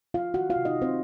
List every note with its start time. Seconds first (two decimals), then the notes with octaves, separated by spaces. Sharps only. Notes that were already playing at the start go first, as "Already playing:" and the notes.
0.14 F3 F4 F5
0.34 D#3 F#4 F#5
0.50 F4 F5
0.56 C3
0.65 D#4 D#5
0.76 D#4
0.82 C4 C5